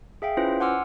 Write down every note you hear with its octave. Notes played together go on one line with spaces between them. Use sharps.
G#4 E5 F5 G5
C#4 E4 F4 B4 C5
F#5 G#5 C6 D6 E6 F6